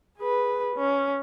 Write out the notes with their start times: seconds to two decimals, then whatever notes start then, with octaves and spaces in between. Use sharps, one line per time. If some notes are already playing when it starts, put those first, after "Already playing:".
0.18 G#4 B4
0.75 C#4